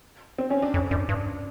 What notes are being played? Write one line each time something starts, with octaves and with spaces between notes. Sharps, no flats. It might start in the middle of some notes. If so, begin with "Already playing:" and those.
C4
C#4
D4
F2
F#2 D4
G2